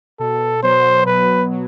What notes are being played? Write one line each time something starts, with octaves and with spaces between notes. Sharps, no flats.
B2 A4
F#3 B3 C5
B2 B4
F#3